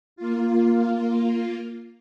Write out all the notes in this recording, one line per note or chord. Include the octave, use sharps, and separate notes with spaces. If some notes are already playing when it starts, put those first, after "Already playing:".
A#3 F4